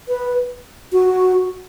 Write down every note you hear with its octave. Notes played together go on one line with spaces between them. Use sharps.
B4
F#4